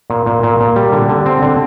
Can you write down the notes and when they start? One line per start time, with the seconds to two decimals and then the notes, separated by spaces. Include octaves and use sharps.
0.10 A#2
0.26 A#2
0.43 A#2
0.60 A#2
0.76 G3
0.93 D3
1.09 D3
1.26 C4
1.42 D3